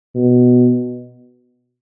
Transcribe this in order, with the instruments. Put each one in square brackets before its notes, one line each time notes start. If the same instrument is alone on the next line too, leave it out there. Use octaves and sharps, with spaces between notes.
[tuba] B2